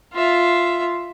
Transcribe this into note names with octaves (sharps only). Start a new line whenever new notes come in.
F4 E5